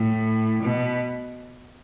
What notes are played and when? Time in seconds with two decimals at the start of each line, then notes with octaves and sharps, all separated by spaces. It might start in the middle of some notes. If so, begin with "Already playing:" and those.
Already playing: A2
0.63 B2